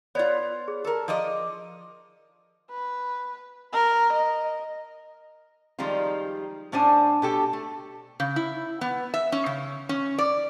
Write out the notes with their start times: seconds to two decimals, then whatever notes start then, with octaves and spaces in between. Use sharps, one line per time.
0.15 B3 F4 C#5 D5 B5
0.68 G#4
0.85 A4 A#4
1.08 F3 D5 D#5
2.71 B4
3.73 A#4
4.13 D#5
5.79 D#3 F3 G3 G#3 D#4 F4
6.72 A2 C#4 D4 C5 G#5
7.22 B2 G4 A4
7.53 A3
8.20 C#3
8.36 E4
8.81 B3
9.14 E5
9.32 C#4
9.46 C#3
9.89 C#4
10.18 D5